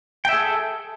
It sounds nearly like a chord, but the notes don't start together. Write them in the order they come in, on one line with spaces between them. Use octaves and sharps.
G5 E5 G#4 A4